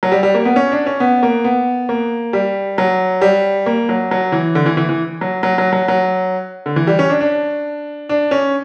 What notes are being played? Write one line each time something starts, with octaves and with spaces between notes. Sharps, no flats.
F#3
G3
G3
A#3
B3
C#4
D4
C#4
B3
A#3
B3
A#3
G3
F#3
G3
A#3
F#3
F#3
E3
D3
E3
E3
E3
F#3
F#3
F#3
F#3
F#3
D3
E3
G3
C#4
D4
D4
D4
C#4